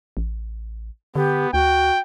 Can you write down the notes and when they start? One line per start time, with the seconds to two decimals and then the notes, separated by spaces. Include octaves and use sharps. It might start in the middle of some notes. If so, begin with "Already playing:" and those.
0.17 A1
1.15 D3 B3 G4
1.54 D2 F#4 G5